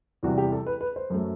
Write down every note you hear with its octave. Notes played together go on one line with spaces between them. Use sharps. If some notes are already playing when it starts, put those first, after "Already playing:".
E2 C3 E3 G3 F#4
G4
A4
B4
B4
C5
F#2 F#3 A3